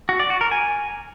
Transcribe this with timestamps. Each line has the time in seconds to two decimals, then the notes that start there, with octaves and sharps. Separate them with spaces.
0.09 F#4
0.20 D5
0.30 F#4
0.41 A#4
0.51 G#5